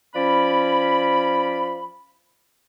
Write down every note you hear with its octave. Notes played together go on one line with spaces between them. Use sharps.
F3 C#4 D5 B5